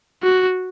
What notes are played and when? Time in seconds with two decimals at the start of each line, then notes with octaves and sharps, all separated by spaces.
0.23 F#4